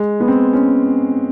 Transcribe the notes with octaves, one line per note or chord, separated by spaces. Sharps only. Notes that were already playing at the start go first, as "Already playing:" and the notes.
Already playing: G#3
B3
C4
C#4